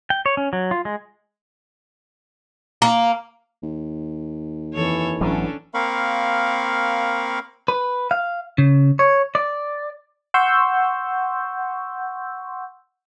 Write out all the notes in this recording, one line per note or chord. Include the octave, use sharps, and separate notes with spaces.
G5
C#5
C#4
F#3
F4
G#3
A#3
D#2
F2 E3 A4 C#5
E1 A1 G2 F#3 C#4 D4 A4
A#3 C4 A#4 F5 B5 C#6
B4
F5
C#3
C#5
D5
F#5 C6 C#6 E6 G6